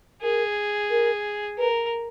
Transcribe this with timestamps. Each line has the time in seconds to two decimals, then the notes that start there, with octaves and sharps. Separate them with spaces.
0.22 G#4 A#4
0.90 A#4
1.58 A#4 B4